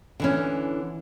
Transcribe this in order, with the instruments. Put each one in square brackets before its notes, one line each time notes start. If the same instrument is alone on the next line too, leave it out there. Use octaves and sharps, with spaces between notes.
[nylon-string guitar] D3 E3 C#4